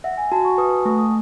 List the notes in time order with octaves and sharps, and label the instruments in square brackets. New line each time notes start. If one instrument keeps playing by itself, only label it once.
[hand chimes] E5 [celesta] F#5
[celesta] G#5
[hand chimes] F#4 [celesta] A5
[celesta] C#6
[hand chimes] B4 [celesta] D#6
[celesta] D#6
[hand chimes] A3 [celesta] C#6
[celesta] D#6